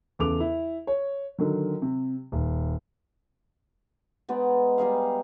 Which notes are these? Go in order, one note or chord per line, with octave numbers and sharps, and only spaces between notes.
E2 C#3 A4 D6 F7
E4
C#5
D3 D#3 F#3
C3
D#1
G#3 B3 D#4 D5
G3 D#4 G#4 F5